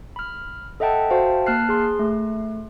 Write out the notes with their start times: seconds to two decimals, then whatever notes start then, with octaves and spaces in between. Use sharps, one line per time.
0.16 B5 F6
0.80 A4 D#5 E5 F#5 G5 A5
1.10 F#4 C5 E5 F5 G5 A5
1.46 A#3 A5 F6 F#6 C7
1.69 G#4 C6
1.99 A3